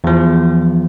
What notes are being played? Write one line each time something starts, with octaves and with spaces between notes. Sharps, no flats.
E2 F3